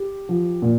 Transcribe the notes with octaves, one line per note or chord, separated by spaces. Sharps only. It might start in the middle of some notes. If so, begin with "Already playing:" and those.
Already playing: G4
F3
A#2